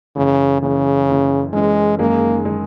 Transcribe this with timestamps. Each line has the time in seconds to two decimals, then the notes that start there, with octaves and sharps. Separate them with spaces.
0.16 F#1 F#2 C#3 E3
0.62 F#1 F#2 C#3 E3
1.08 F#1 F#2 E3
1.53 F#1 F#2 E3 G#3
1.99 F#1 F#2 D#3 G#3 A#3 D#4
2.45 D#3 G#3 D#4